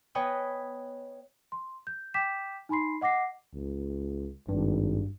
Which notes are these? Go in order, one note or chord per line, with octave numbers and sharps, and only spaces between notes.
B3 B4 C#5 D#5 G5 G#5
C6
G6
G5 D6 G6 B6 E7
D#4 G#5 B5 C6 C7
D#5 F#5 D6 A#6 C7
C#2
G#1 G2